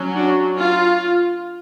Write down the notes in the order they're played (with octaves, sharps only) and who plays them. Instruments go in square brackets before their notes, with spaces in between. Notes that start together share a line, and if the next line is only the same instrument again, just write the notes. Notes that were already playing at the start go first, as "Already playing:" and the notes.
Already playing: [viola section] F#3 C#4
D4 F#4
F4